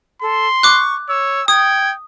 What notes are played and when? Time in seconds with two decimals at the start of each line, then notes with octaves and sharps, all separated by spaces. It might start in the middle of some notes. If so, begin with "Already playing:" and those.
0.22 A4 C6
0.63 C#6 D6 F#6
1.09 C#5 E6
1.48 G5 D#6 G#6